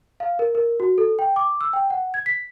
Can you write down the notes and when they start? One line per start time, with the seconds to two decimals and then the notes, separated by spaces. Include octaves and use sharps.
0.20 F5
0.39 A#4
0.55 A#4
0.80 F#4
0.98 A4
1.19 G5
1.36 D6
1.61 E6
1.73 G5
1.90 F#5
2.14 G#6
2.26 B6